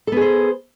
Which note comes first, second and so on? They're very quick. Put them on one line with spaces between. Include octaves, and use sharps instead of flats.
A4 B3 G#4 C5